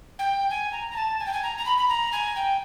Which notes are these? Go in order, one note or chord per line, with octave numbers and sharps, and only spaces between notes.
G5
G#5
A#5
A#5
A5
G#5
G5
G#5
A#5
A#5
B5
B5
A#5
G#5
G5